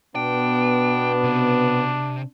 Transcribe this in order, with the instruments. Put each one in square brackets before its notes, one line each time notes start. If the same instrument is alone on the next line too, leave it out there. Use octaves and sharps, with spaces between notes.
[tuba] B2 [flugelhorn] B3 [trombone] D4 [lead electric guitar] G5
[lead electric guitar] C3